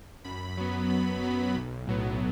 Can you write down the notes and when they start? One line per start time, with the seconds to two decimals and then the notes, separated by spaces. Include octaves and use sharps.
0.24 F#2 B5
0.57 F#3 B3
0.89 F#2 B5
1.22 F#3 B3
1.55 B1
1.87 A2 F#3 B3